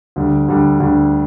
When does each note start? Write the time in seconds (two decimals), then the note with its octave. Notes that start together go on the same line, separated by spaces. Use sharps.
0.16 D2 D3 G3
0.48 D2 D3 G3
0.80 D2 D3 G3